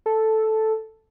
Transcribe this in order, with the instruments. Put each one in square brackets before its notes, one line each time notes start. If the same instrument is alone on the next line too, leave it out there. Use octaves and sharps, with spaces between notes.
[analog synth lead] A4